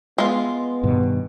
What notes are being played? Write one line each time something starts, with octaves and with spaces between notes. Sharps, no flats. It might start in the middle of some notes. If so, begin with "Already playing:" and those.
G#3 B3 F4
G2 B2 D#3